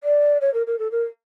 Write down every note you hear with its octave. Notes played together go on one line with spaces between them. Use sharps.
D5
C#5
A#4
A#4
A4
A#4